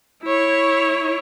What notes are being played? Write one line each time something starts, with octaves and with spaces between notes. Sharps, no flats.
E4 C#5